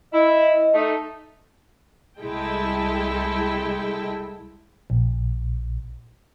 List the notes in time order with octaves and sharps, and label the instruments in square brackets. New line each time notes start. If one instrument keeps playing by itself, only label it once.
[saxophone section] E4 [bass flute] D#5
[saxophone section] A3 D#4
[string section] C2 G#3 E4 A4 G5
[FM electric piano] A#1